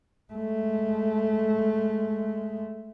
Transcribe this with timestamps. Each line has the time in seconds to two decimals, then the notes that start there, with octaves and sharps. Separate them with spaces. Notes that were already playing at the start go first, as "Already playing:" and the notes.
0.33 G#3 A3